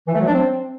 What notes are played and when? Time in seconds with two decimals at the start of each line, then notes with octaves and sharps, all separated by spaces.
0.07 E3
0.14 A3
0.20 F#3
0.27 D4
0.33 C4